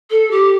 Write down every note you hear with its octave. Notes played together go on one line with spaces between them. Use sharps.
A4
G4